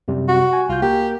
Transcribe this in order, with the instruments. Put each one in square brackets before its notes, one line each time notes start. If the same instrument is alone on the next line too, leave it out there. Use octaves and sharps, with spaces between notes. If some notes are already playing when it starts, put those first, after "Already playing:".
[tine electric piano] F#2 C3 G3
[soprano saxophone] F#4
[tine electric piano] G#5
[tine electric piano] C2 G6 [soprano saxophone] F4
[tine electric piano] A#3 A#4 [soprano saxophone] G4